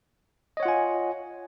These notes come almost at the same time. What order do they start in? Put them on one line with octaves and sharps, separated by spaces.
D#5 C#5 F#5 F4 G#5